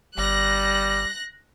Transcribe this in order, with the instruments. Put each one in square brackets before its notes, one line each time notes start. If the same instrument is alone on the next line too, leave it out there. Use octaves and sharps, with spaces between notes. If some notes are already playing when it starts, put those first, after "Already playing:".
[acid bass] G1 [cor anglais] G3 [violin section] F#6 A#6